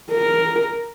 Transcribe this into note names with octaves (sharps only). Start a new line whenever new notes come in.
A#4